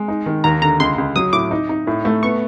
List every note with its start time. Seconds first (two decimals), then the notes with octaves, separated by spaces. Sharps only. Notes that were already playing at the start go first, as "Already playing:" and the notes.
Already playing: G#3
0.08 D#4
0.26 D#3
0.44 D#2 A#5
0.62 D3 A#5
0.80 C#2 C6
0.98 C#2
1.16 F#3 D#6
1.33 A2 D6
1.51 D#4
1.69 D#4
1.87 A2
2.05 A3
2.23 B3 C#6